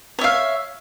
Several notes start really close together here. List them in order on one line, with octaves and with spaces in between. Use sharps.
C#5 E5 F5